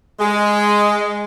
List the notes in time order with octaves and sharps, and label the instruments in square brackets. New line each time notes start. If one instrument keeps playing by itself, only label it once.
[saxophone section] G#3